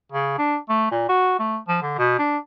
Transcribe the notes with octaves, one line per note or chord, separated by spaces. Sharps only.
C#3
D4
A3
A#2
F#4
A3
F3
D3
B2
D4